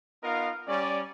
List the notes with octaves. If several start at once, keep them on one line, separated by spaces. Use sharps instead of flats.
B3 D#4 F4 A#4 D#5 F5
G3 C#4 D5